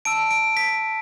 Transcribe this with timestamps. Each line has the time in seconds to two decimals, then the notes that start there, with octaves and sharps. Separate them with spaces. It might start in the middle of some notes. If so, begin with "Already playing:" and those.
0.05 A5 E6 D7
0.31 D7
0.57 B6